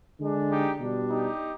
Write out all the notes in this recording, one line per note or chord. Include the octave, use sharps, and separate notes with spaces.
D3 G#3 D4
D#4 G4
B2 G3 D4
D#4 G4